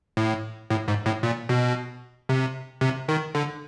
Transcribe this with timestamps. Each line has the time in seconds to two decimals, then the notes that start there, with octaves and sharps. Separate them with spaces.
0.17 A2
0.70 A2
0.88 G#2
1.06 A2
1.23 A#2
1.49 B2
2.29 C3
2.81 C3
3.08 D#3
3.35 D3